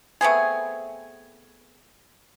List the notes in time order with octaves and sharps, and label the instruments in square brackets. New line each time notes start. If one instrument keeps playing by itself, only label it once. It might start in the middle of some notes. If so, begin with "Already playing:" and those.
[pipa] A3 B3 C4 G#4